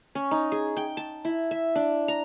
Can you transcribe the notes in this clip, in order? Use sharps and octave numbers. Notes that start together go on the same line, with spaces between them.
C#4
D#4
G#4
G5
A5
E4
E5
D4
A#5